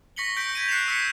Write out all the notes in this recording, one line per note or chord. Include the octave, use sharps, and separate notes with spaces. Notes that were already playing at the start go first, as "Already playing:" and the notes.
C#6 A#6 B6 C#7 F#7 G7
C#6 G6 B6 D7
G#6 D#7
F#6 C7 C#7 E7 F7
E6 B6 C#7